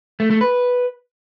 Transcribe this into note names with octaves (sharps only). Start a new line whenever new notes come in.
A3
A3
B4